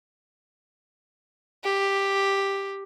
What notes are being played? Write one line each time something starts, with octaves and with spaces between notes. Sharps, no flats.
G4